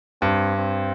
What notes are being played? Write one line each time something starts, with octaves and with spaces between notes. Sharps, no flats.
G2 C4
C4